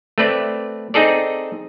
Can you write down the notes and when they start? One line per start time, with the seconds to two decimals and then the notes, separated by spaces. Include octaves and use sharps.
0.18 A3 C4 B4 D5
0.94 C4 D#4 G#4 A4 D5